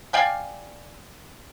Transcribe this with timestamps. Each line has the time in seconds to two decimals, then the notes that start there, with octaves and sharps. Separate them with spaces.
0.13 D5 F5 G5 G#5